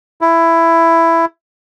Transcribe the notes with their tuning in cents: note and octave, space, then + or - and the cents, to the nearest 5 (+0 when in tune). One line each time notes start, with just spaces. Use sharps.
E4 +10